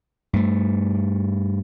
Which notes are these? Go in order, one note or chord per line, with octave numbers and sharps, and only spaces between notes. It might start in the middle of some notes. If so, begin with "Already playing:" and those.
G2 A3